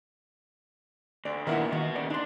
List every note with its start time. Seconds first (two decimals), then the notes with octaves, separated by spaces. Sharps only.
1.25 D2 D5
1.47 A#2 D#3 B3 D4 E4 A#4 E5 F#5
1.72 D#3 B3 F#4
1.96 A#2 C#3 D5
2.10 D4 D#4 C6